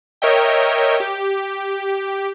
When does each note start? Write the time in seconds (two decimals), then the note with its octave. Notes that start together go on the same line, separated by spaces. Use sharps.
0.22 A#4 C#5 D#5 E5 G5
1.00 G4